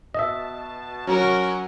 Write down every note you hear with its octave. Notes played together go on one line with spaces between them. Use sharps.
B2 D#5 E5 A5
F#3 C#4 F#4 A#4 A#5